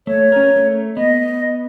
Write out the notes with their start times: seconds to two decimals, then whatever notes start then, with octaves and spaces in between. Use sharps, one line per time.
0.07 A3 C#5
0.32 C#4 A#4
0.56 A3
0.97 B3 D#5